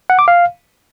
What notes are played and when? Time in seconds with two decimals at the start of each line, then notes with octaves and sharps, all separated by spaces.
0.10 F#5
0.19 D6
0.28 F5